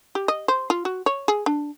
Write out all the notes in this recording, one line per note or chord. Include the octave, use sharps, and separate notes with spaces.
G4
D#5
C5
F4
F#4
C#5
G#4
D4